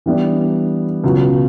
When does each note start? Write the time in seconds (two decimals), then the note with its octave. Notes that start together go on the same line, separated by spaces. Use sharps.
0.06 E3 G3 B3 D4
1.04 C#2 B2 F#3